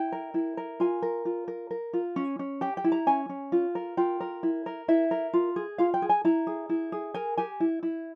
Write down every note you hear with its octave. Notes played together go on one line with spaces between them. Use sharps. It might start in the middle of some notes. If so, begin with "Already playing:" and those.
Already playing: E4 G5
A#4
E4
A#4
F4 G#5
A#4
F4
A#4
A#4
F4
C#4
C#4
G4 G5
G5
E4
A#5
C#4 G#5
C#4
F4
A#4
F4 G5
A#4
E4
A#4
E4 E5
A#4
F4
G#4
F4 F5
G5
G#4
G#5
E4 A#5
G#4
E4
G#4
A#4 G#5
G4 G#5
E4
E4